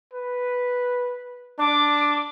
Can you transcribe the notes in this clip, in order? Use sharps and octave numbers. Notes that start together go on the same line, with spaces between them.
B4
D4 D6